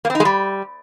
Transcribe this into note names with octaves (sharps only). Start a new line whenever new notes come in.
A#3
C4
D#4
G#3
G3